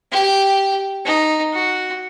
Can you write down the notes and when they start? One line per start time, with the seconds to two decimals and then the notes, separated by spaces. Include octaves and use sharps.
0.12 G4
1.05 D#4
1.54 F#4